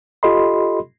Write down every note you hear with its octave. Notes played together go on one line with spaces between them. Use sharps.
F4 G4 A4 D#5 B5 C6